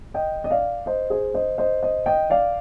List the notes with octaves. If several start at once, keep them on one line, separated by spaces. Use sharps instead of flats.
D#5 G5
D#5
D5 F5
C5 D#5
G#4 C5
C5 D#5
C5 D#5
C5 D#5
D#5 G5
D5 F5